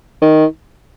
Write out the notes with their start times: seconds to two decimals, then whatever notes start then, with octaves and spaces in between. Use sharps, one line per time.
0.22 D#3